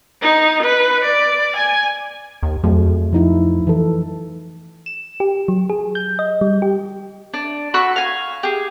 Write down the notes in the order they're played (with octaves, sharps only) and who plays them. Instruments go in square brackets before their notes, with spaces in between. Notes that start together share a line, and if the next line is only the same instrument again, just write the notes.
[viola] D#4
B4
D5
G#5
[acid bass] D#2
[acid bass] F2 [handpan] F#3 A3 G#4
[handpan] F3 D#4 E4
E3 A4
[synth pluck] E7
G4
F#3
G#4
G6
D#5
G3
G4
[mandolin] D4
F#4 B5 C#6 E6
F5 G#5
G4 G#4